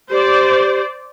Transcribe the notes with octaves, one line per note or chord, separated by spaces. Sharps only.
G4 C5 D5